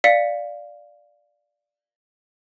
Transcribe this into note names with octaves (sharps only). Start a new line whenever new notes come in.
D5 F5 B6 C#7